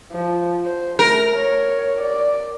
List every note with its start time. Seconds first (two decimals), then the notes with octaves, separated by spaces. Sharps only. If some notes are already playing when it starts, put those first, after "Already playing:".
0.12 F3
0.65 C5
0.99 A3 A#4
1.36 C#5
2.01 D5